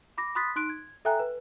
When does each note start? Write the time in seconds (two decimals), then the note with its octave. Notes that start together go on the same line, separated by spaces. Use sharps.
0.18 B5 D6 A#6
0.35 B5 C6 D#6 F#6 A6 B6
0.56 D#4 C6 F#6 D7
0.70 G#6
1.05 A4 E5 G5 G#5 A#5 F#6
1.19 B4